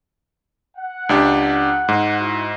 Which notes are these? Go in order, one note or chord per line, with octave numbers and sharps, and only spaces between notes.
F#5
C#2 D4 G4
G#2
E4 F#4